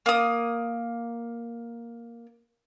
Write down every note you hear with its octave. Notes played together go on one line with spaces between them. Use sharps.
A#3 D#6